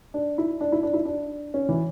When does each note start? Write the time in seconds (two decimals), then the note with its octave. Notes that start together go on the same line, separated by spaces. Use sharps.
0.14 D4
0.38 E4
0.61 D4
0.72 E4
0.83 D4
0.93 E4
1.05 D4
1.54 C#4
1.69 E3